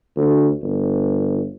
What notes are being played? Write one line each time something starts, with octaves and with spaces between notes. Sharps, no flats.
D2
G1